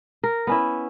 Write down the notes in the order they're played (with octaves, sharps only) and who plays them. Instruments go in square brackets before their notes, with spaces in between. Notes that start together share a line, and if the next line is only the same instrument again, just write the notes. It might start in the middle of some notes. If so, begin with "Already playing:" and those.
[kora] A#4
B3 C#4 E4